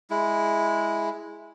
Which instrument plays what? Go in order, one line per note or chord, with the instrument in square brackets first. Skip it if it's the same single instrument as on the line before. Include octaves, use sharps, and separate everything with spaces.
[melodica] G#3 E4